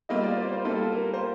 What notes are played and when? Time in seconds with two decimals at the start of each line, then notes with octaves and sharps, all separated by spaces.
0.09 G3 A#3 F4 D#5
0.23 D5
0.37 C5
0.52 C5
0.65 G3 A#3 F4 A4
0.92 A#4
1.14 C5